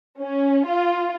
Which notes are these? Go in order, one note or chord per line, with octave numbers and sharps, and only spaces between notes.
C#4
F4